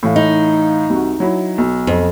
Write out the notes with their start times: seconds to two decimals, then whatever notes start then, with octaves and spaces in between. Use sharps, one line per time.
0.03 A2 E3 F5
0.16 D#4
0.90 C2 F#4
1.20 F#3 E4
1.58 B1
1.87 F2